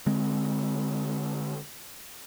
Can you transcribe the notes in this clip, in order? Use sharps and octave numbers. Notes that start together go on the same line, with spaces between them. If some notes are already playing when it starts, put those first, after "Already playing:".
D3 G#3 C4